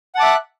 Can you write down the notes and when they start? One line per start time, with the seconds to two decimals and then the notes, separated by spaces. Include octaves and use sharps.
0.15 F#5
0.18 A5
0.20 D6
0.23 E5
0.25 F#6